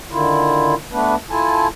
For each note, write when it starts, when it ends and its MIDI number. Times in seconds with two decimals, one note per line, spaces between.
0.11 0.75 50
0.11 0.75 51
0.11 0.75 64
0.11 0.75 65
0.92 1.15 57
0.92 1.15 59
0.92 1.15 62
0.92 1.15 71
1.30 1.67 64
1.30 1.67 65
1.30 1.67 69
1.30 1.67 80
1.30 1.67 81